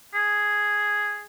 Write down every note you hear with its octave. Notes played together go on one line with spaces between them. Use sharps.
G#4